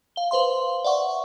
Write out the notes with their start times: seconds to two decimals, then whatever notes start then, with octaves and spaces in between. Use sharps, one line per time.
0.16 F5 G7
0.31 B4 C5 F5 C6
0.84 D5 E5 F#5 C#6